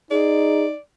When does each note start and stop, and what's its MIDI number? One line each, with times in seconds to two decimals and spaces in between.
0.11 0.74 63
0.11 0.65 68
0.11 0.78 74